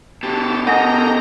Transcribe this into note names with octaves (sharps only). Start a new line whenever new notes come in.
B2 D3 G4 A5
B3 A4 A#4 D#5 F#5 G5 A#5